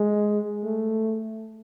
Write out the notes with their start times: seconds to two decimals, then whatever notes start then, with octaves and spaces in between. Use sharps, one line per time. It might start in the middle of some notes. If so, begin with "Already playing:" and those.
Already playing: G#3
0.64 A3